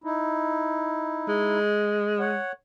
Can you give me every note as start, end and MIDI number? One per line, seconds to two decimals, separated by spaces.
0.04 1.58 63
0.04 1.58 64
1.28 2.38 56
2.20 2.52 73
2.20 2.52 78